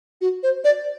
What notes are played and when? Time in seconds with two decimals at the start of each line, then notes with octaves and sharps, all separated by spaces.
0.21 F#4
0.43 C5
0.64 D5